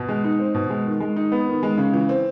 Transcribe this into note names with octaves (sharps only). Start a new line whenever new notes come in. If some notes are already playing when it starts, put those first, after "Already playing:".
Already playing: B2
G#3
D#4
C4
B2
G#3
D#3
G#3
D#4
B3
D#3
G#3
C#3
E3
C4